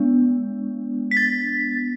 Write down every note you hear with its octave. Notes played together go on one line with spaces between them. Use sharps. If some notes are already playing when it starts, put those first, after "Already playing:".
Already playing: G#3 B3 D4
B6
A6